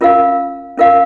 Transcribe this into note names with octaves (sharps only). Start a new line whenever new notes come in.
C#4 F4 A#4 F5
C#4 F4 A#4 F5